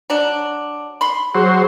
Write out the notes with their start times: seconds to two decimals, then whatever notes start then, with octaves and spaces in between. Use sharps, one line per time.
0.10 F#3 D4
1.01 B5 C6
1.35 F#3 G#4 C5